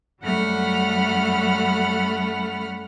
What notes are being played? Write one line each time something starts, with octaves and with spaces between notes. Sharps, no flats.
F#2 G3 A3 F#5 B5 F6